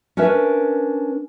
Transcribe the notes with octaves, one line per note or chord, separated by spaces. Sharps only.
C#4 D4 A#4 B4 E5